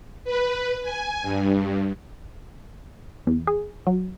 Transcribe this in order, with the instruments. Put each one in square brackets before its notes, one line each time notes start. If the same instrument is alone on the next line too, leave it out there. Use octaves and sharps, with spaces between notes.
[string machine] B4
G#5
G2
[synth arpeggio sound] E2
G#4
F#3